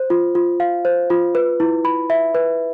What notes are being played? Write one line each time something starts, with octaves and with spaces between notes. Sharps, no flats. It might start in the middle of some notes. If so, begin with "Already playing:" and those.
Already playing: C5
F4
F4
F5
C5
F4
B4
E4
B5
E5
B4